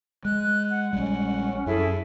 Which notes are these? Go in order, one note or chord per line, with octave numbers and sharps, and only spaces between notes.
G#3 F#6
F#5
A#1 G3 G#3 C#4
F#2 E4 G#4 A4